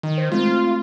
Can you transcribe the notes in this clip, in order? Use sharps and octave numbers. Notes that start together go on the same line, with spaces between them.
D#3
C5
G#3 A3 C4 F4